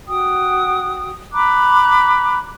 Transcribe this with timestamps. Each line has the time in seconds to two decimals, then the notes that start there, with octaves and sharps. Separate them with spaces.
0.08 F#4 G5 D#6
1.33 A#5 B5 D6 F#6